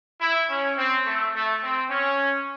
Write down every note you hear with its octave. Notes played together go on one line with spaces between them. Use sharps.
E4
C#4
C4
A3
A3
C4
C#4